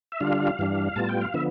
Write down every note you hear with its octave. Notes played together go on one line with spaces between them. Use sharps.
E5
D3 G3 D4 F4 F5
G2 E3 G3 D4
A2 G3 B3 F4 A5
G5
F5
D3 F3 B3 E5